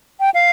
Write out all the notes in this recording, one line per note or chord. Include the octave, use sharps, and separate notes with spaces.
G5
F5